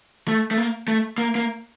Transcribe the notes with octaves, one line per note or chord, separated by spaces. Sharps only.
A3
A3
A#3
A3
A#3
A#3